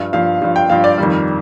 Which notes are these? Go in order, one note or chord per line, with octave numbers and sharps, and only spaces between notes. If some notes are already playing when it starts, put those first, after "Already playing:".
Already playing: G2 F3
G2 F3 F5
G2 F3
G5
G2 F3 F5
D5
F2 D#3 G3